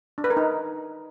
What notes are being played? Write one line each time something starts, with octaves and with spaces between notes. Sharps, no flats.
D4
B4
A#4
D#4